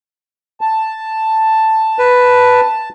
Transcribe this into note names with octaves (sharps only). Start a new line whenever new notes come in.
A5
B4